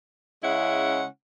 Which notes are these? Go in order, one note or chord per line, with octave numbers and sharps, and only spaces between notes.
C#3 G#3 C#4 E4 F#5